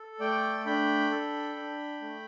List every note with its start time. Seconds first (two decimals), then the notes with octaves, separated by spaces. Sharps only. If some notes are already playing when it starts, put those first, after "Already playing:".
Already playing: A4
0.20 A3 D5 G5
0.66 D4 G5 B5
1.11 A4
1.56 D4
2.01 A3